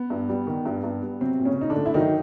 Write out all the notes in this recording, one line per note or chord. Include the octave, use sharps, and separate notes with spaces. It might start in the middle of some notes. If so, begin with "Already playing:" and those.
Already playing: B3
G2
G3
D#3
G2
G2
G3
C3 F#3 C4
A#2
C#3 C#4
A#2 D#4
D3 D4
A3
E4
D#3 F#3 D#4